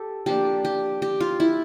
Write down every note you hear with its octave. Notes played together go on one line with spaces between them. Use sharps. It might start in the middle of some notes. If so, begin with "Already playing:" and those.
Already playing: G4 A4
F3 A#3 D4 G4
G4
G4
F4
E4